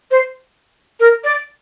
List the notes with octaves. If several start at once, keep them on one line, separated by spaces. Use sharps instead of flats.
C5
A#4
D5